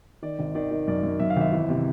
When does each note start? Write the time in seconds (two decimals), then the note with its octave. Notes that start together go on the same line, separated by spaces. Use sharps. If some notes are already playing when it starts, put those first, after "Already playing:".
0.22 D#3 D5
0.39 G#1
0.55 D#3 D5
0.71 D#3
0.87 F#2 D5
1.03 F#2
1.20 F#2 E5
1.30 F5
1.36 G#1 E5
1.52 E3
1.69 C3